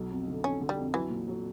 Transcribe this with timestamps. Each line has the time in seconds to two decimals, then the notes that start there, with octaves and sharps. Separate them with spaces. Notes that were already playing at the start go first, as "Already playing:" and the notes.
Already playing: B1 F#3
0.10 F2
0.28 D3
0.44 F2 C#4
0.61 D3
0.69 G3
0.78 F2
0.94 E3 F#3
1.10 A#2
1.28 F#3